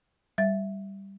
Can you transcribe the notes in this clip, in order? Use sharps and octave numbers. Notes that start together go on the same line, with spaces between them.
G3 E5 A6